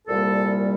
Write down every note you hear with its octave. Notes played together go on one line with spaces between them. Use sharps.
C2 A#2 G3 A#3 A4